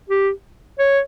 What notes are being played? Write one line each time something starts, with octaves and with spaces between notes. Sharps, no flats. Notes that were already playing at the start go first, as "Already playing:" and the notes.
G4
C#5